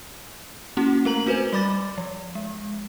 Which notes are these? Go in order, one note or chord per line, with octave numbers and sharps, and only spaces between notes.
A#3 C#4 E4 F#4
A3 A#4 A#5 F#7
C4 F#4 B4 C5 G#5
G3 D5 B5 D6 A6
F3
G#3